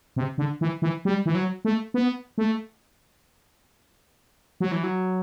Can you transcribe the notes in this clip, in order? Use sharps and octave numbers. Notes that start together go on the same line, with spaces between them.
C3
D3
E3
E3
G3
E3
F#3
A3
B3
A3
F#3
E3
F#3